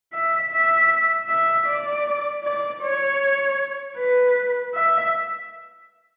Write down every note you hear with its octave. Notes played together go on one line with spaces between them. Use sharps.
E5
E5
E5
D5
D5
C#5
B4
E5